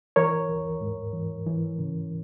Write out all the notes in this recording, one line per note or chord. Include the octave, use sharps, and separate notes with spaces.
E3 A#4 C#5
D#2
G#2
E3
E3
C#3